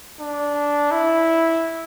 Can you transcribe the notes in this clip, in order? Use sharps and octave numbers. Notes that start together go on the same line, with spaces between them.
D4
E4